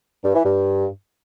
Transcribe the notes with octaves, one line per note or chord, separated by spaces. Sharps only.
G2
E3
G2